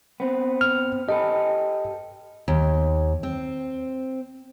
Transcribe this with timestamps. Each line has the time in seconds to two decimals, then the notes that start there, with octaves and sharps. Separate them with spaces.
0.20 B3 C4
0.61 F6
1.09 G4 A4 B4 D#5
2.48 D#2
3.23 C4